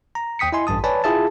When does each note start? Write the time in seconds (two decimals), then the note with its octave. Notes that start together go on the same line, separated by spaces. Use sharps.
0.15 A#5
0.39 D#2 G5 D#6 B6 C#7
0.52 E4 D#5 G#5 C6
0.67 A1 G2 A5 D#6
0.84 B4 C#5 D5 G#5 A5 B5
1.04 E4 F4 G#4 E5 A5